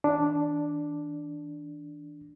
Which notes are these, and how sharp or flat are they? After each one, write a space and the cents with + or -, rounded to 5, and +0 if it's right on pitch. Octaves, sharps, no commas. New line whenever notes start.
E3 -45 D4 +0